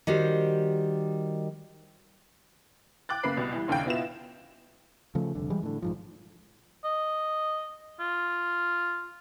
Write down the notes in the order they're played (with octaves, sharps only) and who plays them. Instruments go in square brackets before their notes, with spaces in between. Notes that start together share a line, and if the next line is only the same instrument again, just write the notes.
[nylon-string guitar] D#3 G3 F#4 G4 C5
[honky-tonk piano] G5 D6 F#6 A6
F#2 C#3 A#3 B3 B5 C7
C2 B2
E3 G3
A#1 D#2 C#3 F5 G5
B2 B3 E4 F4 E7
[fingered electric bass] C#3 F3 A3
F1 C2 D3
E3 G3 G#3
A2 D3
A#1 G#2 F3
[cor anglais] D#5
F4